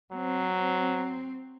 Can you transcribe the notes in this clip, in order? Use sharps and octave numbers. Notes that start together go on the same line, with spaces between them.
F#3 C4